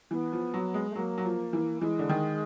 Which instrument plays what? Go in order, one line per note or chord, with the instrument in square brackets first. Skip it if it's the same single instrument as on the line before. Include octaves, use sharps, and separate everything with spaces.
[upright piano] E3 [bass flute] B3
[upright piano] F3
F#3
G#3
[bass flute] A3
[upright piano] F#3 [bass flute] A#3
[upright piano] F#3
F3
E3
[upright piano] E3 [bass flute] G#3
[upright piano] D3
D#3